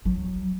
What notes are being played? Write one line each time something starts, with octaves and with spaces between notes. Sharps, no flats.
F#3